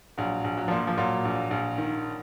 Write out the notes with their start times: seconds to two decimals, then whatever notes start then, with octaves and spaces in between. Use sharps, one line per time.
0.17 A#1 F#3
0.44 A#1
0.57 F#3
0.68 A#2 F3
0.87 F3
0.97 A#2 F#3
1.25 A#1
1.51 A#1
1.78 D#3